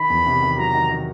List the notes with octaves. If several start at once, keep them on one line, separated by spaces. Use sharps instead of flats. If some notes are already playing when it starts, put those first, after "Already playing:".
Already playing: D#3 B5
E2
C3
D#3
F#3 A#5
D#3
D#3